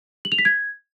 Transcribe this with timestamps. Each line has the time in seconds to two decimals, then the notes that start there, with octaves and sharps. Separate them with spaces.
0.25 F#7
0.32 F7
0.38 B6
0.45 G#6